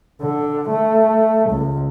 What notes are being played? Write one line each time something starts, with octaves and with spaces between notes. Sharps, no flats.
D3
A3
C#2